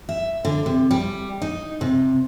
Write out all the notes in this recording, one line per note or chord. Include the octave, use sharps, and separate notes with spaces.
E5
D3
C3
G3
D#4
C3